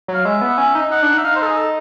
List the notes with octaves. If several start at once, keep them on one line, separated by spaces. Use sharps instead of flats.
F#3
F5
G#3 E5
B3
C#4
D#4
D#4 F#5
D4
D#4
E5
D#4 F5
C5
A4
G#4
A4